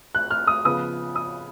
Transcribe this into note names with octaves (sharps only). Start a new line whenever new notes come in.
F#6
F6
D#6
C#3 F3 B3 D#6
D#6